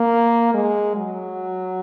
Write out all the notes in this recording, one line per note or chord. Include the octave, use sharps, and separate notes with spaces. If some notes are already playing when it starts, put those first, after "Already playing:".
Already playing: A#3
G#3
F#3